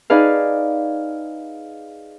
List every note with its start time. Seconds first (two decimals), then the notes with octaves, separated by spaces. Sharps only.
0.10 D#4 G#4 B4 D5 F5